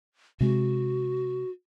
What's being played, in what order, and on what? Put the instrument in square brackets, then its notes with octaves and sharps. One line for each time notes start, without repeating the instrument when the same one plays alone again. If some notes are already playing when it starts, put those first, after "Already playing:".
[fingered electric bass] C3 G#3 [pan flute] F#4